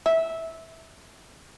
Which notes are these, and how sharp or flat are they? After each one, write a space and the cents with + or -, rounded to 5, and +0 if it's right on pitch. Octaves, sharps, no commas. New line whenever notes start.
E5 -15